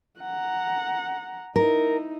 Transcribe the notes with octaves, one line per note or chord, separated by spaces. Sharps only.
F#5 A#5
D#4 E4 A#4